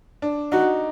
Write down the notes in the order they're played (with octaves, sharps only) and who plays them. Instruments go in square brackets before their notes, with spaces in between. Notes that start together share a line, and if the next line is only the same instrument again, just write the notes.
[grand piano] D4
[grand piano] D#4 [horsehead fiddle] F#4